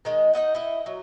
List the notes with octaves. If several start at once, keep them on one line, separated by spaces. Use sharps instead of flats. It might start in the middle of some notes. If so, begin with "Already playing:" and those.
D#3 G#3 D#5
D#4 E4 D#5 F#5
E4 D#5
F#3